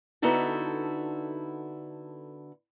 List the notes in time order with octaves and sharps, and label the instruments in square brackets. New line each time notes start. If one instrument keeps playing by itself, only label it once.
[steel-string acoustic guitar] D3 B3 D#4 E4 F#4 A4